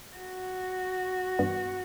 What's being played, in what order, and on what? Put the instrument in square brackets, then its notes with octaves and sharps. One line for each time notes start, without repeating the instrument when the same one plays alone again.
[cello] F#4
[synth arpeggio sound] G2 E3 G3 B3